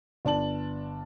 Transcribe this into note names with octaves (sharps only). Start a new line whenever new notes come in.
G1 D4 A5 F#7